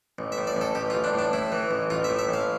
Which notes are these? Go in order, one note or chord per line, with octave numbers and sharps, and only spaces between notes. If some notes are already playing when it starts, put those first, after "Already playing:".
A1
E5
A2
D5
A1 A4
A1 G4
F4
A1
D4
A2
D4
A2 E4
E3
A1
A1 F4
E5
A2
E5
A1 F5